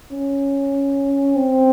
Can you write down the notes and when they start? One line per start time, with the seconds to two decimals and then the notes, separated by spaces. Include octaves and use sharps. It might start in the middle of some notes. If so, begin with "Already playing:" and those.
0.11 C#4
1.36 C4